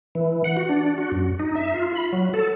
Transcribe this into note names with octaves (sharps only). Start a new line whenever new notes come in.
E3
F#5
F#4
D4
F#4
F#2
D#4
E5
F4
B5
F#3
A4